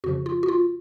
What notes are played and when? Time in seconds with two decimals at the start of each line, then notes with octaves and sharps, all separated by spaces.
0.04 F2 C#3 F3 F#4
0.26 F4
0.43 F#4
0.48 F4